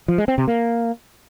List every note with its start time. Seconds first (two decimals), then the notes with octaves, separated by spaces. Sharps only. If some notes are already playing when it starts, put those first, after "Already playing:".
0.08 F3
0.18 G#3
0.28 C4
0.38 C3
0.48 A#3